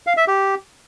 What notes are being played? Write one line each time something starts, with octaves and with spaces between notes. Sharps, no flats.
F5
E5
G4